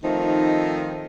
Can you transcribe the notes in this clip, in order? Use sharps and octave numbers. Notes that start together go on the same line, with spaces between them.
D#3 F3 A3 C4 D#4